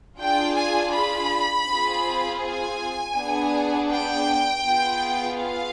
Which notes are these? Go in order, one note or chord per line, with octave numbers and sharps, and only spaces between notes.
D4 F4 G#4 G5
G#5
B5
C4 F4 G#4
G#5
B3 D4 G#4
G5
B3 F4 G#4
F5